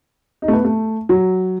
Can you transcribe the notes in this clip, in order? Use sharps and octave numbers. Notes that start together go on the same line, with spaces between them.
D#4
A3
B3
A3
F#3